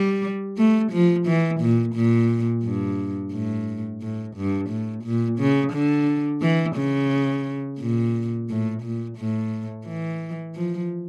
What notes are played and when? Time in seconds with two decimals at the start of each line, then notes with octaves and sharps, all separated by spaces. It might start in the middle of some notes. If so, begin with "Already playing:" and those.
Already playing: G3
0.57 A3
0.92 F3
1.27 E3
1.61 A#2
1.95 A#2
2.64 G2
3.33 A2
4.02 A2
4.36 G2
4.70 A2
5.04 A#2
5.39 C#3
5.73 D3
6.42 E3
6.76 C#3
7.79 A#2
8.49 A2
8.83 A#2
9.18 A2
9.86 E3
10.55 F3